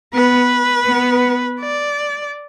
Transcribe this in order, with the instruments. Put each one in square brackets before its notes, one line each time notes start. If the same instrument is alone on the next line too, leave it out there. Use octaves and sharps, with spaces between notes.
[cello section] B3 [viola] B4
[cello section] B3
[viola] D5